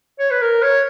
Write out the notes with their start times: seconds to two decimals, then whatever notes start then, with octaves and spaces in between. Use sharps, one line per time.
0.19 C#5
0.31 B4
0.41 A#4
0.63 C#5